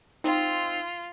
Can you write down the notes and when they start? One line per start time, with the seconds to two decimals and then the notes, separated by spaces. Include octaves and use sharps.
0.24 C4 D#4 F4